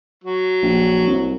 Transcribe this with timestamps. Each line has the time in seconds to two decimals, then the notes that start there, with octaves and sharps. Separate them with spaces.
0.24 F#3
0.63 A#1
1.06 C2